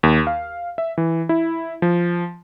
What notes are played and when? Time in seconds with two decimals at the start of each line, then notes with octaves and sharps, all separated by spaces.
0.03 D#2
0.27 F5
0.78 E5
0.98 E3
1.29 E4
1.82 F3